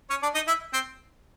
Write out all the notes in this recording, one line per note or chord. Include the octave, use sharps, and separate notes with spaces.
C#4 C#5
D4 D5
D#4 D#5
E4 E5
C4 C5